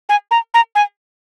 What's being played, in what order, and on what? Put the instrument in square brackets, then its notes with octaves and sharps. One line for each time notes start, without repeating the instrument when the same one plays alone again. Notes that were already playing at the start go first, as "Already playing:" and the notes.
[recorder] G#5
A#5
A#5
G#5